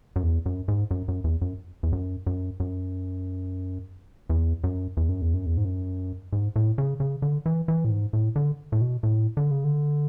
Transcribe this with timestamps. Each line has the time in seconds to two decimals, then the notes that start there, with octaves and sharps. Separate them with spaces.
0.16 F#2
0.23 E2
0.46 F#2
0.68 G#2
0.91 F#2
1.08 F#2
1.24 E2
1.42 F#2
1.83 E2
1.93 F#2
2.27 F#2
2.60 F#2
4.30 E2
4.64 F#2
4.97 E2
5.09 F#2
5.22 E2
5.34 F#2
5.46 E2
5.57 G#2
5.65 F#2
6.33 G#2
6.56 A2
6.78 C#3
7.00 C#3
7.22 D3
7.46 E3
7.68 E3
7.85 A2
7.90 G#2
8.13 A2
8.36 D3
8.72 A2
8.81 B2
9.03 A2
9.37 D3
9.51 C#3
9.64 D3